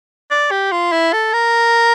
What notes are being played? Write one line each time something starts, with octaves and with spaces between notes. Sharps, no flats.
D5
G4
F4
E4
A4
A#4